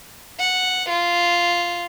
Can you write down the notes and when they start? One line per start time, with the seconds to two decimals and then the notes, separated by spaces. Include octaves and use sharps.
0.39 F#5
0.89 F4